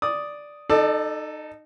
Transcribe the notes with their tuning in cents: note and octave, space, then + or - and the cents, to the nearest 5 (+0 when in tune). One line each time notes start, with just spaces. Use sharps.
D5 +0 D#6 +0
D#4 -20 A4 +0 D5 +30